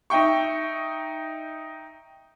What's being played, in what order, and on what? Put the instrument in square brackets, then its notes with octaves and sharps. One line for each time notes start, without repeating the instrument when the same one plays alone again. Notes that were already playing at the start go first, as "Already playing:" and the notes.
[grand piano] D#4 E5 G5 C#6